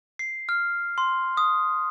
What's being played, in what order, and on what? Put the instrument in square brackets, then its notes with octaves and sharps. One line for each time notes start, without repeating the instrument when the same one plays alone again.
[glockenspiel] C7
F6
C6
D#6